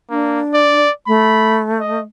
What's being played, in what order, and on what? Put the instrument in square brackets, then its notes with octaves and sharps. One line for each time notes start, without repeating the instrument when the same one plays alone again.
[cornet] A#3 [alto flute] D4
[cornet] D5
[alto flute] A3 [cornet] B5
[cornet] D#5